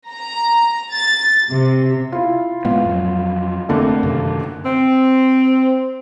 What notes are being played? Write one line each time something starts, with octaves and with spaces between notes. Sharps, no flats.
A#5
A6
C3
E4 F4
A2 G#3 B3 F4
F2 F#3
F1 D3 A3 A#3 C4
F#2 C3 D#3
C4